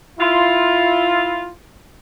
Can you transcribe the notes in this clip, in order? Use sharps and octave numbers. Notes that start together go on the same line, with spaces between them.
E4 F4